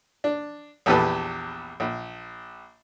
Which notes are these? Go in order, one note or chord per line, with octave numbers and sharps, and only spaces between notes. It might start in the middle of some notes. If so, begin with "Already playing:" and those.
D4
A#1 E2 G4 A4 B4 A5
A#1